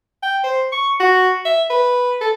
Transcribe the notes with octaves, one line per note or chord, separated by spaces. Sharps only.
G5
C5
C#6
F#4
E5
B4
A4